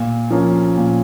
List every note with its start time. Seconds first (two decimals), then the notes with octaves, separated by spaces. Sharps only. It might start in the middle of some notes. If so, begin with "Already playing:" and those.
Already playing: A#2
0.31 F3 A#3 C#4
0.77 A#2